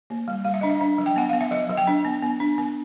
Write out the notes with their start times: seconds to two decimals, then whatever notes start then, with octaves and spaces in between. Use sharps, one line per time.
0.10 A#3
0.28 G3
0.45 G3 F5
0.54 E5
0.61 D4 D#5
0.70 E5
0.81 D4
0.98 F#3
1.06 G5
1.16 B3 F#5
1.29 B3 F5
1.41 E5
1.51 F#3 D#5
1.70 F#3
1.77 G5
1.87 D4
2.05 B3
2.22 B3
2.40 D4
2.58 B3